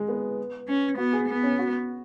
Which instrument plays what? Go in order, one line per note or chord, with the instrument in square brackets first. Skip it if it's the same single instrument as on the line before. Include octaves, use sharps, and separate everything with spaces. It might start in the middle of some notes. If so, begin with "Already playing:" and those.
Already playing: [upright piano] G#3
B3
[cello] C#4
[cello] B3 [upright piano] F#4
[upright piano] G#4
[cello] B3
[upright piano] C#4
F#4